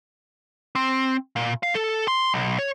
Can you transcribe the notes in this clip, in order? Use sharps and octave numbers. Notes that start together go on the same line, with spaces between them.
C4
A#2
F5
A4
C6
B1
C#5